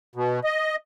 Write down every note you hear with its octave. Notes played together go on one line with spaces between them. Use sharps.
B2
D#5